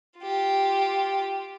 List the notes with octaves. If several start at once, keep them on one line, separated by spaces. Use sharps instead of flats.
F4 G4